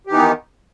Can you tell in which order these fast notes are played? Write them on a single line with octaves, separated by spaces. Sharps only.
G4 E3 D#4 B3 D#3